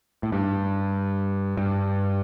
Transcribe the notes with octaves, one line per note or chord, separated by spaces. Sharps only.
A2
G2
G2